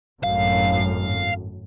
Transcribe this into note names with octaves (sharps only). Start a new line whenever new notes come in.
G#1 F#2 A2 F5